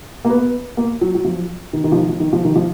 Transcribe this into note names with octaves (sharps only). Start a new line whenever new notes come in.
A#3
B3
A#3
F#3
F#3
F3
D#3
D#3
F3
D#3
F3
D#3
F3
D#3
F3